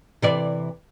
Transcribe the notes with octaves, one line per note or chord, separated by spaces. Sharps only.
C3 E3 D5